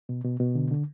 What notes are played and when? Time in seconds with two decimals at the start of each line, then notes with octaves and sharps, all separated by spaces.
0.09 B2
0.24 B2
0.40 B2
0.55 D3
0.71 D3